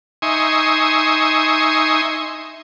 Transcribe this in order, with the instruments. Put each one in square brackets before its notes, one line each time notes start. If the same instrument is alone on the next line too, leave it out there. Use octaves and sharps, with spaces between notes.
[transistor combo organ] D#4 E5 G#5 C6 C#6 D#6